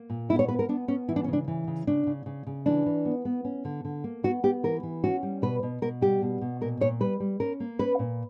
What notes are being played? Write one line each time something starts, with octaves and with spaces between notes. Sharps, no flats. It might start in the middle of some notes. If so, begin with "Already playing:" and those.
Already playing: A#3
A#2
B3 E4
C#5
B3 B4
A#4
B3 D4
B3 C#4
E3 E4
D4
C#4
C#3
D4
E3
C#3
C#3 D4
C#3
C#3
C#3
E3 D4
E3
B3
B3
C#4
D3
D3
A#3
B3 F#4
B3 G4
E3 A#4
E3
C#4 F#4
G3
B2 B4
B2
B2 A#4
G3 G4
B2
B2
A#2 A#4
A#2 C#5
G3 B4
G3
C#4 A#4
A#3
C#4 B4
A#2